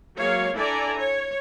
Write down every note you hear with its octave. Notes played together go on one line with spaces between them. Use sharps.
F#3 G#3 A#3 C#5 F5
D4 E4 A4 D5 G#5 A#5
C#5